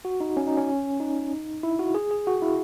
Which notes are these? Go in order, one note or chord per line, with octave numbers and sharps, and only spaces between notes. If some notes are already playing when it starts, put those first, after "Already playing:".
F#4
D#4
C#4
D#4
C#4
D#4
E4
F#4
G#4
G#4
F#4
E4